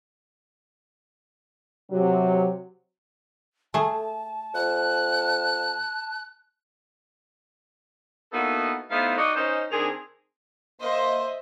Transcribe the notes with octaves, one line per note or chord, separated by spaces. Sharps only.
C3 F#3
A3 G#4 A5
F2 F#6
A#3 B3 D#4 E4 F#4 A4
A3 B3 D#4 E4 C5 F5
D#4 F#4 D5 D#5
C#4 D#4 C5
D#3 C4 D4 G#4
A#3 C5 D#5 E5 C6